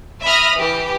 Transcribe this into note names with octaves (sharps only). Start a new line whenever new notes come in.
E5 B5 D#6 F6 A#6
E3 G4